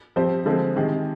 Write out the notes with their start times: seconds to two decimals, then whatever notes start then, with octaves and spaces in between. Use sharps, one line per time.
0.16 F3 C4 G4 C5
0.46 D3 F3 G#3 C4
0.76 C3 D#3 G#3